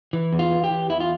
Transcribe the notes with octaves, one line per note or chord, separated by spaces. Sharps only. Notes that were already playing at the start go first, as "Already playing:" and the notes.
E3
E2
F4
E3
G4
E3
E2 E4
F4